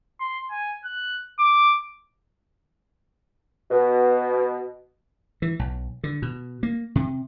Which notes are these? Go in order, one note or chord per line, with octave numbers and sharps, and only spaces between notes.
C6
G#5
F#6
D6
B2
E3
B1
D3
B2
A#3
C3